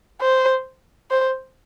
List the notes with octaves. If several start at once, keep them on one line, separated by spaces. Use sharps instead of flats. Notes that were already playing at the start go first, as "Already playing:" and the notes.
C5
C5